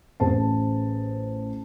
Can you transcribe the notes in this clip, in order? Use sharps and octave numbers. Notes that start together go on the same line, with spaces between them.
A1 G#4 C5 A5